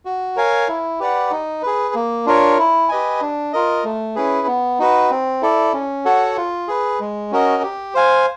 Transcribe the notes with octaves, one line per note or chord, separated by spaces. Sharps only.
F#4
A#4 C#5 F5 G#5
E4
G4 B4 D5 F#5
D#4
G#4 B4
A#3
D4 F4 A#4 C#5
E4
G4 B4 D#5 G#5
D4
F4 A#4 D#5
A3
C#4 E4 G#4 B4
B3
D#4 F#4 B4
C4
E4 A4 D5
C#4
F#4 A4 C#5 F#5
F4
G#4 B4
G#3
C#4 F#4 A#4 D#5
G4
C5 F5 G#5